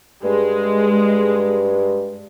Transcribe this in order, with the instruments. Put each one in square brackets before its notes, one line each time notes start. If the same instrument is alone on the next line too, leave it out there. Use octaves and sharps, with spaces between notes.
[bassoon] G2 [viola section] G#3